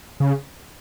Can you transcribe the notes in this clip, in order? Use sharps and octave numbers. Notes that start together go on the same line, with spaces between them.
C#3